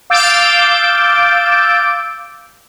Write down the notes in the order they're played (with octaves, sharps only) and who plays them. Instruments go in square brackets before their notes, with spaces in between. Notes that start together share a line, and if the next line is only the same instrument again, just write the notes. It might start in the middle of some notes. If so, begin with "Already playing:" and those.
[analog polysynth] F5 D6 E6 G6 A6 D7